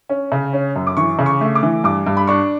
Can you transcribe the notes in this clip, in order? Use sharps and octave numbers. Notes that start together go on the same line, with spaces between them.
C#4
C#3
C#4
F#2
D6
E3 C#6
C#3
C#6
A3
D6
E3
G2 D6
G2
B5
D4 C#6